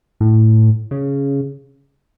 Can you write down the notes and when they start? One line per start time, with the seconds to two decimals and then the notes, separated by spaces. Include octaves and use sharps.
0.20 A2
0.91 C#3